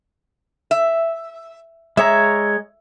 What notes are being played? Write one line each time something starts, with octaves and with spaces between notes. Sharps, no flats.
E5
G#3 C#5 E5 A#5